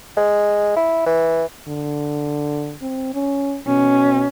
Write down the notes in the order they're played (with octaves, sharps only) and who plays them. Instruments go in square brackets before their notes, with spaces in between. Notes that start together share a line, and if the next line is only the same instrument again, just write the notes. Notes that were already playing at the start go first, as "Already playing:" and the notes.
[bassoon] G#3
E4
E3
[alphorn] D3
C4
C#4
[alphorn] B2 [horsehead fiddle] C#4